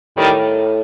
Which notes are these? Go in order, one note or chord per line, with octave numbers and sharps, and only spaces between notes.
A2 D#3 G3